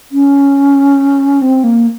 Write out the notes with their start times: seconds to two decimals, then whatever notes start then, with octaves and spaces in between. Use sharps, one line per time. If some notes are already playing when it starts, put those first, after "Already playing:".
0.12 C#4
1.42 C4
1.64 A#3